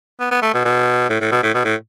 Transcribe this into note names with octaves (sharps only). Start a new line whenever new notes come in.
B3
B3
A3
B2
B2
A2
A2
B2
A2
B2
A2